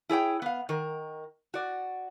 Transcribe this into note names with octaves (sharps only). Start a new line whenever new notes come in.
E4 G#4 C#5 G5
B3 F5
D#3 A#4
F#4 D5